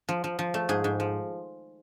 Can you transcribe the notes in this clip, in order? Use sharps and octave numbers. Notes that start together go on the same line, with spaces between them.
F3
F3
F3
A3
G#2 G#4
G#2
F3